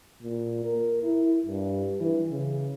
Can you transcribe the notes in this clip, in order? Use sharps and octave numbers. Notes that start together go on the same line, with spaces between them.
A#2
A#4
E4
G2
E3
C#3